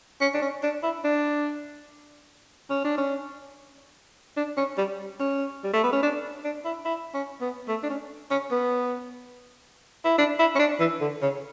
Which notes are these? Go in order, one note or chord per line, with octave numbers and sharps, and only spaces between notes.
C#4
D4
C#4
D4
E4
D4
C#4
D4
C#4
D4
C#4
G3
C#4
G3
A3
B3
C#4
D4
D4
E4
E4
C#4
B3
A3
D4
C#4
C#4
B3
E4
D4
E4
C#4
D4
E3
D3
C#3